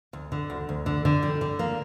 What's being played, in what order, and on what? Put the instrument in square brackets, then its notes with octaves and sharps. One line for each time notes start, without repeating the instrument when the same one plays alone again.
[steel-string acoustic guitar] D2
D3
D2
D2
D3
D3
G3
D3
A#3